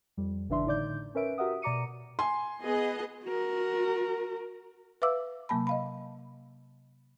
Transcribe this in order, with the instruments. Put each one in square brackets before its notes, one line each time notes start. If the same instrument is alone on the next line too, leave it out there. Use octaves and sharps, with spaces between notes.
[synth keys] F2 G3
G#1 C#3 E3 D4 E5 C6
A2 D3 D#4 D5 D6 G6
C#4 A#4 B4 E5 D7
F#4 G4 A#4 E5 F#5 D#6
B2 D5 A#5 D6 C#7 D#7
[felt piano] G#5 C6
[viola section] B3 D#5 [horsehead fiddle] G#4
[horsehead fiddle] F#4 A#4
[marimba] B4 E5 F5 D6 E6
C3 F#3 A#3 A5 B5
D#5 F5 B5